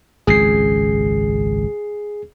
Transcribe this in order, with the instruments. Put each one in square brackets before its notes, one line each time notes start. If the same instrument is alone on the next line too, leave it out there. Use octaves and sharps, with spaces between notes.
[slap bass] G#1 C#2 F#2 [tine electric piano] G#4 C7